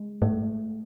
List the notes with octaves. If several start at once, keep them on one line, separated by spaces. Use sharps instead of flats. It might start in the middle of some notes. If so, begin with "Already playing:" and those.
Already playing: G#3
G#2 A3